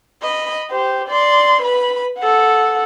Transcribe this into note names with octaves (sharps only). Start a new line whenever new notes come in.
D#5 B5
G4 C5
D5 C6
B4 B5
A4 F#5